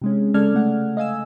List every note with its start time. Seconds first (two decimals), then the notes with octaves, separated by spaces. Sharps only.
0.01 C3 G#3 C#4
0.34 C#3 G#3 A4 D5 F6 G#6
0.55 A3 F#5 F6
0.97 D#5 F5 G#5 E6